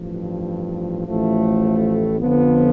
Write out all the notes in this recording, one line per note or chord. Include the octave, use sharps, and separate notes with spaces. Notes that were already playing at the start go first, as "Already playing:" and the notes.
Already playing: A1 G2 F3
A1 A2 F3 A3
F2 D3 F3 B3